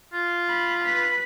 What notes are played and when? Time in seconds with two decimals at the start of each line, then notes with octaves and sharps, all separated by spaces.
0.13 F4
0.49 B5
0.84 B4 B6